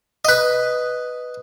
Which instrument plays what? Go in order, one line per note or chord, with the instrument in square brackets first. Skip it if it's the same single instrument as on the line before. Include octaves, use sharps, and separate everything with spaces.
[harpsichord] B4 D#5